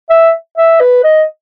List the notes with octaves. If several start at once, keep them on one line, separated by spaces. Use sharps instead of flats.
E5
E5
B4
D#5